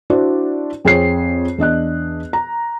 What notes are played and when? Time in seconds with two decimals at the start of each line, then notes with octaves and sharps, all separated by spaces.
0.10 D4 E4 F#4 C5 D5
0.85 F2 C4 G#4 C5 C#5 C7
1.58 E2 D4 D#5 F#6
2.33 A#5